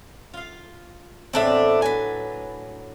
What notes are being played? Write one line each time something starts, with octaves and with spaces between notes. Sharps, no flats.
F4 F5
E2 A2 C4 D4 E5 A5
F#3 D4 B4 G#5